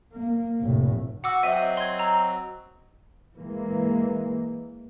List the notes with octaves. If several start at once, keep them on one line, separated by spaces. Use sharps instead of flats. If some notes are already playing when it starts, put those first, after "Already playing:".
A#3
F1 A2
F#4 F#5 D6 E6
F#3 C4 D#5 E5 D#7
C6 G#6
A#5 E6
E3 G#3 A#3